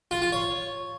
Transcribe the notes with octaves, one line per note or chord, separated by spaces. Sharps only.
F4
F4
C#5